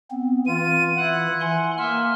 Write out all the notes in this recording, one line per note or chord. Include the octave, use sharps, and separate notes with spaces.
B3 C4
E3 F4 D#7
E4 F#5
G#5 C6
A#3 E5 C6 F6